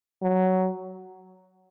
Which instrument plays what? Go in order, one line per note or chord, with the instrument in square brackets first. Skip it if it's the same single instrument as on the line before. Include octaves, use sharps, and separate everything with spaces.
[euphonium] F#3